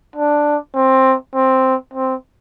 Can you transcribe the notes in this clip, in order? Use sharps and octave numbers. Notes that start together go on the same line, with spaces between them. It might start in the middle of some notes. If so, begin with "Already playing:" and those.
D4
C4
C4
C4